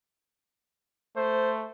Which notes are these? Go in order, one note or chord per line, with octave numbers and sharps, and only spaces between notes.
A3 C5